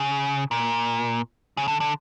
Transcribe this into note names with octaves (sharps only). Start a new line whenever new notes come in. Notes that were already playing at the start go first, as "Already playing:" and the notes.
Already playing: C#3
A#2
C#3
D3
D3